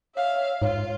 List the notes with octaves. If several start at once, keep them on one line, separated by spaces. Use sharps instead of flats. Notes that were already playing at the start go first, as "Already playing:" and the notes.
C#5 E5 F5
G#2 F4 C#5